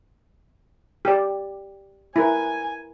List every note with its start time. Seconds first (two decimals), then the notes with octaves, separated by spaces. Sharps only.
1.05 G4 D5
2.16 E4 A#4 B4 G#5